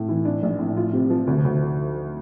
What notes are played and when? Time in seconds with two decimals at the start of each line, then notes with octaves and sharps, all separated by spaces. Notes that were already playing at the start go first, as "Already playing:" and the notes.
Already playing: A2
0.09 E3
0.25 D4
0.43 A#1
0.59 A2
0.77 F4
0.93 C3
1.10 F3
1.27 D2
1.44 D2